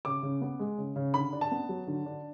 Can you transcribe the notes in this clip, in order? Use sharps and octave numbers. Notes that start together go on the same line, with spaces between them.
C#3 D6
C#3
B3
G#3
C#3
C#3
D3 B5
D4
A5
B3
F#3
D3
D4